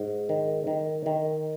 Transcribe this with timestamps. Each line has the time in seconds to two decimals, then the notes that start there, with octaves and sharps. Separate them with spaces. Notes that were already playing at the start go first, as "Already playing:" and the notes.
Already playing: G#2
0.29 D#3
0.67 D#3
1.06 D#3